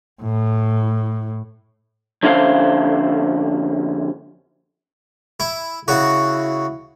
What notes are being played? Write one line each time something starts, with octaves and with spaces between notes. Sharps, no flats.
A2
F2 D3 C#4 E4 C5 F5
E4
C#3 E4 F#4